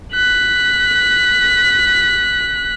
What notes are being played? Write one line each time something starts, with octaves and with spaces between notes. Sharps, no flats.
F#6 B6